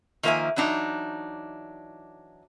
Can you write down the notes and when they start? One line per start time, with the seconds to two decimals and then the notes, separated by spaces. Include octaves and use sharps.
0.23 D#3 F3 A#3 B4 E5 G#5
0.56 E3 F#3 D4 D#4